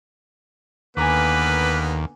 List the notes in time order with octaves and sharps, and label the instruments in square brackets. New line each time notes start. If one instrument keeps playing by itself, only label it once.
[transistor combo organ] D#2 [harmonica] D3 A#3 B3 [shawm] B4 [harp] G#5 A#5 D6